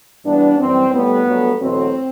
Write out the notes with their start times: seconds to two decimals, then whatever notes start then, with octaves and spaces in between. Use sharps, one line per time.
0.25 G2 E3 G3 B3 D4
0.59 F#2 E3 G3 C4
0.92 A2 G3 B3
1.26 G2 F#3 A3
1.60 E2 B2 F#3 A3 C4